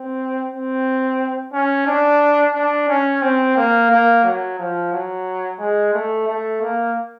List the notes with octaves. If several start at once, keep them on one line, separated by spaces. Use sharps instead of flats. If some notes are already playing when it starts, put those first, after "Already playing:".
Already playing: C4
C4
C#4
D4
D4
C#4
C4
A#3
A#3
F#3
F3
F#3
G#3
A3
A3
A#3